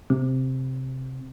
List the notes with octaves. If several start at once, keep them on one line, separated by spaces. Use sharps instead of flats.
C3